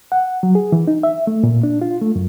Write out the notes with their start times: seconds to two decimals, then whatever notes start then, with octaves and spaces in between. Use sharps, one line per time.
0.12 F#5
0.43 F#3
0.55 G#4
0.72 E3
0.87 D#4
1.03 E5
1.27 A3
1.44 A#2
1.63 D4
1.81 F4
2.01 A3
2.16 F#2